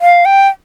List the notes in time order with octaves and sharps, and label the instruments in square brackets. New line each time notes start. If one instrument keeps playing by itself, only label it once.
[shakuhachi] F5
G5